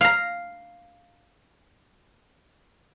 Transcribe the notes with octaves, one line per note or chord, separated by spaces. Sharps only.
F5 A#5